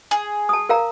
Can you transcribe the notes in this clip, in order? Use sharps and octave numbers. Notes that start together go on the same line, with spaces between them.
G#4
A5 D#6
A#4 F5 A#5